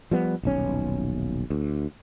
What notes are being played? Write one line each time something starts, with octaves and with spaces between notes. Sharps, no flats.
F3 G3 B3
D#1 B1 C#4
D2